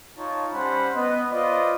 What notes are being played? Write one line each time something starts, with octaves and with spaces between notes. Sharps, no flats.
D#4 F4 C#5 A5
G3 C#4 C5 F#5 B5
B3 D#5
F4 B4 C5 D5 D#5